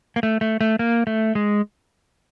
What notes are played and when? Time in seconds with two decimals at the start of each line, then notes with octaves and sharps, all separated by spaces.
0.16 A#3
0.23 A3
0.41 A3
0.61 A3
0.79 A#3
1.07 A3
1.35 G#3